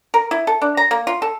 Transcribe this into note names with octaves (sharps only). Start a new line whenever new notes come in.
A#4
E4
A4
D4
A#5
A#3
F4
A4